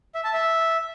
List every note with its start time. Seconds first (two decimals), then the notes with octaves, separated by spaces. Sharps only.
0.15 E5
0.24 A5
0.33 E5